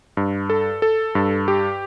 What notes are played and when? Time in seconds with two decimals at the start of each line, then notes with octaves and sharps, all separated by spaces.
0.17 G2
0.50 A4
0.82 A4
1.15 G2
1.48 G4